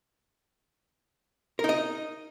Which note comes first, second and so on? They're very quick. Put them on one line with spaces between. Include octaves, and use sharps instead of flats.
A#4 D#4 D#5